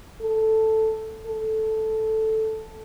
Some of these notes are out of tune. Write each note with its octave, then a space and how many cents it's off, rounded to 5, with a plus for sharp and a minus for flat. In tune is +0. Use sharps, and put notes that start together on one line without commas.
A4 +0
A4 -5